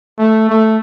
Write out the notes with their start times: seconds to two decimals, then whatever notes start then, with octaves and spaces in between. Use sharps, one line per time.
0.18 A3
0.49 A3